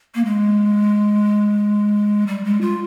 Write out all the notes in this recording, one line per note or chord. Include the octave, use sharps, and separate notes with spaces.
A#3
G#3
G3
G#3
F4